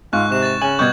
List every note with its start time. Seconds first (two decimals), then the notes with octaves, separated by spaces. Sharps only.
0.13 G#2 F4 C#6 F#6
0.30 C3 F#6 E7
0.43 C#6 A6
0.62 C#3 G#5 F#7
0.79 B2 G3 C#6 G6 G#6